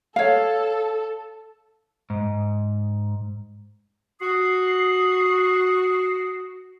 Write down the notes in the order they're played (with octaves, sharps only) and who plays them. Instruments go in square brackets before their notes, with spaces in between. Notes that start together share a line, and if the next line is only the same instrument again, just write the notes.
[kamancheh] A4 [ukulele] C#5 F5
[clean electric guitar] G#2
[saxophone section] F#4 [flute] D#6 [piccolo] C7